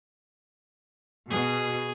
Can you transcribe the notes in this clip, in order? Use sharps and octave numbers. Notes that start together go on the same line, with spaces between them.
B2 G#4